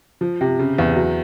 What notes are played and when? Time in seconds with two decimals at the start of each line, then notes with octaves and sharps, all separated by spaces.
0.21 F3
0.41 C3
0.59 C#3
0.78 E2
0.96 F#3